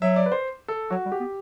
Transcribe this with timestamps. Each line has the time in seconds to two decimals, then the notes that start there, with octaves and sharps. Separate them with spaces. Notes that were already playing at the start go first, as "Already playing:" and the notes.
0.01 F#3 E5
0.16 D5
0.26 B4
0.32 C5
0.68 A4
0.90 F#3 F#4
1.05 G3
1.12 G4
1.20 B3